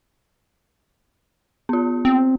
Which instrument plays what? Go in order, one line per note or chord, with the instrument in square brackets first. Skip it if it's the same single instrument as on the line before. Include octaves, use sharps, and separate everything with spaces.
[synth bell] B3 F4
[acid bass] C4